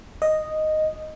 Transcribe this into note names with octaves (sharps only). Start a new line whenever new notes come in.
D#5